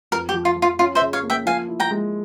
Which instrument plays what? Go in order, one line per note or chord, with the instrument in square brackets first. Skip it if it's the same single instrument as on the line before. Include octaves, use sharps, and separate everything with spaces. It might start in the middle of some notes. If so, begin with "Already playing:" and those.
[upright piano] F2 [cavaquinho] A#4
[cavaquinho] G4
[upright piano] F3
[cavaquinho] F4
[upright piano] F3
[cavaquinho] F4
[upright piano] C#4 [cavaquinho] F4
[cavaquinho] C5 E5
[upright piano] C#3
[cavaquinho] C#5 F5
[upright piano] A#3
[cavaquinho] E5 G5
[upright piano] F3 [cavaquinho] F5 G#5
[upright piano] E4
[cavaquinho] G5 A#5
[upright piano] G#3